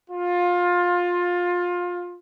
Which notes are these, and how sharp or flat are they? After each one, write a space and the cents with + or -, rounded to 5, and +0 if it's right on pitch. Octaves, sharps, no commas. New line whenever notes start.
F4 +20